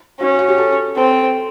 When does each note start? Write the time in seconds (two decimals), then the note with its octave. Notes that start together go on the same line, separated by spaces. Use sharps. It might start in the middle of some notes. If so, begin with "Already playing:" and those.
0.20 C#4 F#4
0.39 F#4
0.49 G4
0.58 A4
0.97 C4 A4